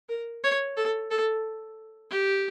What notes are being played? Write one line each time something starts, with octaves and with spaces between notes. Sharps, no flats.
A#4
C#5
A4
A4
G4